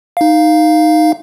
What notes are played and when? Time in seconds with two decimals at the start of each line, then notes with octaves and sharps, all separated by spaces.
0.17 D#4 F5